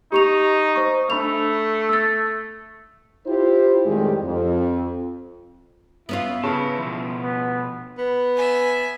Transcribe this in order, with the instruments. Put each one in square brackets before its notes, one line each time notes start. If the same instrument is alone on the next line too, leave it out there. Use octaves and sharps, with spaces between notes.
[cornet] D#4 [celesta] G4 C#6 F7
[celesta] C5 C#6
[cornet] A3 [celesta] D4 B5 F7
[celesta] E6 A6
[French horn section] E4 F4 G4 C5
F2 A2 D#3 G3 G#3 G4
F2
[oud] B3 C#4 F4 [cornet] E4
[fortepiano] C#3 [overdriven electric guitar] B4 A5
[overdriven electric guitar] B2 F3
[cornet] B3
[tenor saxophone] B3
[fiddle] E5 G#5